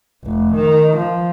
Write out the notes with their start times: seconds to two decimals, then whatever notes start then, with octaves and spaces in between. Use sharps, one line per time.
0.24 F1
0.55 D#3
0.97 F3